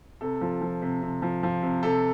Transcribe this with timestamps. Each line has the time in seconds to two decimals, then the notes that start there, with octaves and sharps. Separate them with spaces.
0.21 C3 A4
0.41 F3
0.61 F3
0.82 C3
1.02 C3
1.22 F3
1.43 F3
1.63 C3
1.83 C3 A4